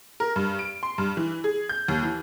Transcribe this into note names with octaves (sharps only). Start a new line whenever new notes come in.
A#4
G2
D7
C6
G2
E3
G#4
G6
D#2
E3